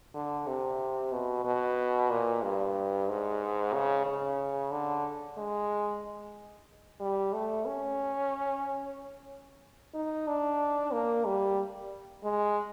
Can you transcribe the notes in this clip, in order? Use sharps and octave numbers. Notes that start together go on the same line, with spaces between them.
D3
C3
B2
B2
A#2
G2
G#2
C#3
C#3
D3
G#3
G3
A3
C#4
D#4
D4
A#3
G3
G#3